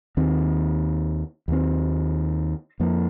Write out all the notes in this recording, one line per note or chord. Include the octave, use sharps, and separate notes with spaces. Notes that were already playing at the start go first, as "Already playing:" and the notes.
D#2 D#3 C4
D#2 D#3 C4
F2 F3 A#3